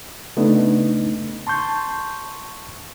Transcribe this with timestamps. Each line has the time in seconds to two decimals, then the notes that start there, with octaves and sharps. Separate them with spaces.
0.37 C#3 A3 B3 D4 D#4
1.47 A5 C6 C#6 G6